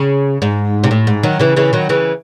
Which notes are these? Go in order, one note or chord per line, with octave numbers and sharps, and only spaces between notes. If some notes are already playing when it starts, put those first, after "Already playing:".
Already playing: C#3
G#2
C3
A2
G#2
D#3 F#3
C#3 E3
C#3 E3
D#3 F#3
C#3 E3